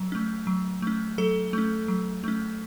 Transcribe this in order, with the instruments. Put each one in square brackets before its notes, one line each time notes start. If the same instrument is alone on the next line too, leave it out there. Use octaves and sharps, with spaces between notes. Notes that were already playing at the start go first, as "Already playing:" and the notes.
Already playing: [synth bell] F#3
A3 C#4
F#3
A3 C#4
F#3 A4
A3 C#4
F#3
A3 C#4